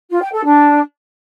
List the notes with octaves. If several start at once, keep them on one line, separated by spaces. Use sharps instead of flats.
F4
G5
A4
D4